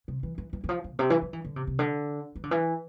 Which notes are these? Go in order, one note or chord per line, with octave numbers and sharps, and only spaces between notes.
C3
E3
E3
E3
E3
F3
E3
A#2
C3
E3
F3
E3
D3
C3
C3
D3
E3
D3
E3